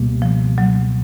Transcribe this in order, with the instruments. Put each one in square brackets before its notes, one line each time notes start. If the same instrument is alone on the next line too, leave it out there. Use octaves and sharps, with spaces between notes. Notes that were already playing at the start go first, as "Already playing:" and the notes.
Already playing: [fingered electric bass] C#2 B2 G3 A#3
[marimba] F3
F#3